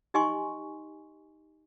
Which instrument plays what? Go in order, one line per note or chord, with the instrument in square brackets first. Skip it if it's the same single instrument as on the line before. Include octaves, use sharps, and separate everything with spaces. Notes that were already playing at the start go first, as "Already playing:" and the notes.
[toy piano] D#4 G4 D#5 G#5 C6 C#6